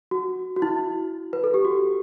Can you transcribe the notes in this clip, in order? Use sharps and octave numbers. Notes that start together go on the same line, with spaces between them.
F#4
F#4
E4
B4
A4
G4
F#4